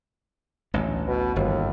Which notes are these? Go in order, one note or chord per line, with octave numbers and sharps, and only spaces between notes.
A1 D2
B2
G1 D#2